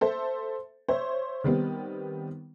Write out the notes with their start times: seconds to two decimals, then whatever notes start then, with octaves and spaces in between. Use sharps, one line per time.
0.01 A4 C5 E5
0.88 C5 C#5 E5
1.44 D#3 G3 B3 C4